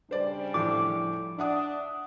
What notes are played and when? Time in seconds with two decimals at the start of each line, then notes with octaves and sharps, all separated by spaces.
0.11 C#3 G3 D4 C5 D5
0.54 A2 F3 D6
1.39 D4 E5 F#5 D#6